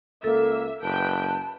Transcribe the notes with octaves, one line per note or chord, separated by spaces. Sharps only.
C#2 A#3 A4 E5
F#1 B4 G5 A5